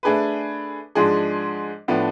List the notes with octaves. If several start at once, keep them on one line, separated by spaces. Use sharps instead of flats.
A3 D4 G#4 B4
G#2 F3 G#3 D4 G#4
A2 F3 B3 D4